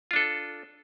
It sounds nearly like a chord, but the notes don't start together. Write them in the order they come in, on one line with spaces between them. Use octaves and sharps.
F4 D4 A4